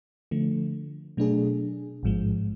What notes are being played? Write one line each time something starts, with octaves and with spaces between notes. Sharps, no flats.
D3 F3 A3
B2 F#3 A3 D4 G#4
A1 G#2 F3 G#3